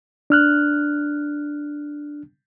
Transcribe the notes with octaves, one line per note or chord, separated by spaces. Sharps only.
D4 F6 F#6